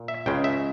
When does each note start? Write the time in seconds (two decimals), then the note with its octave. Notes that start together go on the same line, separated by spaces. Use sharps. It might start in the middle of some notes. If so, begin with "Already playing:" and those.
Already playing: A#2
0.08 E5
0.26 C#2 C#3 G#3 G5
0.44 E5